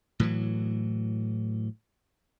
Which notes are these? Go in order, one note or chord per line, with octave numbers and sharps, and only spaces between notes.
A2 E3 F#3